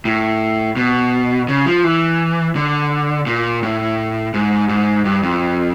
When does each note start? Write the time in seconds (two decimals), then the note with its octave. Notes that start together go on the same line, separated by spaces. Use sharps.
0.05 A2
0.77 B2
1.48 C#3
1.66 F3
1.84 E3
2.56 D3
3.27 A#2
3.63 A2
4.34 G#2
4.69 G#2
5.05 G2
5.23 F2